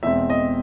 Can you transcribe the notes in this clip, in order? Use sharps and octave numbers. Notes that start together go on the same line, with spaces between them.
E2 B2 G#3 C4 E5
D#5